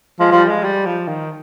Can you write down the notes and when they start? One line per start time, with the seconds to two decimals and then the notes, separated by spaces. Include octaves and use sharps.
0.20 F3 G#3
0.32 F3 G3
0.49 G#3
0.64 G3
0.86 F3
1.08 D#3